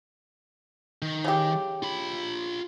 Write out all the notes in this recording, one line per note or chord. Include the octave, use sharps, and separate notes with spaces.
D#3
C#3 G4
F4 B5